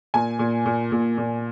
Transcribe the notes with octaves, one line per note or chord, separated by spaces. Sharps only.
A#2 G#5
A#2
A#2
A#2
A#2